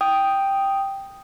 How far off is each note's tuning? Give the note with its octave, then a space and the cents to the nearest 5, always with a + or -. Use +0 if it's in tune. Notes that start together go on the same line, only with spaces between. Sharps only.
G5 +0 D#6 +0